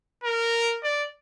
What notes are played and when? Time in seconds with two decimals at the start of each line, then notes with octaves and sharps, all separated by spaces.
0.24 A#4
0.84 D5